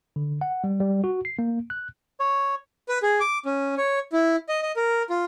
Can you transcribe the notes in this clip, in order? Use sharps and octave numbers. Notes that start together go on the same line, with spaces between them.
D3
F#5
G3
G3
F#4
C7
A#3
F#6
C#5
B4
G#4
D6
C#4
C#5
E4
D#5
D#5
A#4
F4